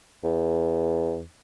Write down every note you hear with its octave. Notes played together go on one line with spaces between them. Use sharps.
E2